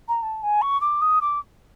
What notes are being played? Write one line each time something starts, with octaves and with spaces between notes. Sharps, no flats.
A#5
A5
G#5
C#6
D6
D#6
D6